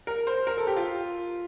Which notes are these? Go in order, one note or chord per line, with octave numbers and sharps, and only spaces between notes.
A#4
C5
A#4
A4
G4
F4